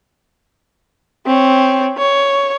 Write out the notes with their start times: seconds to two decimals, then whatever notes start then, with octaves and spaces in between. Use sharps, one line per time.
1.26 C4 C#5
1.98 C#5